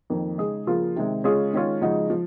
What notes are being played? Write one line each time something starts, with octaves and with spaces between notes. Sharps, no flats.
F2 D#3 A#3
C#3 G#3 D#4 G#4
C#3 F3 A#3 F4
C3 D#3 G#3
C#3 G#3 C#4 F4 G#4
D#3 G#3 C#4 F4
C#3 F3 G#3 D#4 F#4
F3